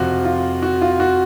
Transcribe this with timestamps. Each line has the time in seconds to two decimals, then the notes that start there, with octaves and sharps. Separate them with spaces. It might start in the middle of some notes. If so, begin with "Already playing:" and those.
Already playing: F2 C3 F3 F#4
0.25 F4
0.62 F#4
0.81 F4
1.00 F#4